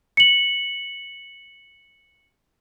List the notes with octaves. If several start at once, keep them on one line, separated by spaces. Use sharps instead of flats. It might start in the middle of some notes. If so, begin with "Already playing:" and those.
C#7 F#7